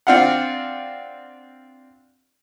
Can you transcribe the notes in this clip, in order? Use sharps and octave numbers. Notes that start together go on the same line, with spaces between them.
C4 D4 F4 F5 F#5